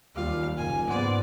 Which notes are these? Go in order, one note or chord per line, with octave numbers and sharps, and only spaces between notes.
D#2 G3 F4 G4 D5 F5
F#1 G#5
G#2 B3 C5 D5 F#5